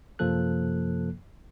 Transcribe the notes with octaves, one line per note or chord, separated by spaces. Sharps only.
F#2 C3 F3 A#3 A4 F#6